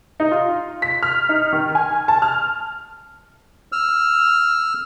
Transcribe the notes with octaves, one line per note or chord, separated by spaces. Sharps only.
D#4
F4
B6
F6
D#4
D#3
G#5
A5
F6
E6 F6